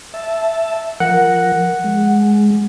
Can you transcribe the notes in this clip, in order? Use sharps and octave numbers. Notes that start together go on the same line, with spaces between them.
E5 A5
F3 A#4 F#5
G#3